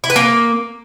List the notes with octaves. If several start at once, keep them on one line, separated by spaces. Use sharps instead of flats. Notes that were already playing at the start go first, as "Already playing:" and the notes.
E4
B4
A#3